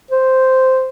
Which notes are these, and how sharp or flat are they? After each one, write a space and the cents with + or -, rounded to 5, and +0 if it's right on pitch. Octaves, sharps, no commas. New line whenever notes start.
C5 -5